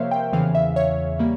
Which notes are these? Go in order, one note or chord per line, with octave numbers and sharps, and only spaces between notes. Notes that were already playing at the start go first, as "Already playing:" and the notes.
Already playing: C3 F3 A#3 A#4 C5 C#5 E5 F5
G5
E2 C#3 E3 F5
E5
C#5
G3 A#3